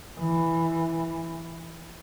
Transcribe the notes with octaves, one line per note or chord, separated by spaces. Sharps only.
E3